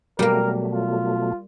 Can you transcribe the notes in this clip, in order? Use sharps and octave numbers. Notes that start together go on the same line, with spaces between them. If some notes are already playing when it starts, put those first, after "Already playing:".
B2 F#3 G3 A3 A#3 A#4
F4